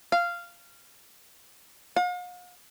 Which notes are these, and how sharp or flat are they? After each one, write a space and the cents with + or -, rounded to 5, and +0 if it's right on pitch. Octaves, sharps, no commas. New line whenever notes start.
F5 -10
F5 +45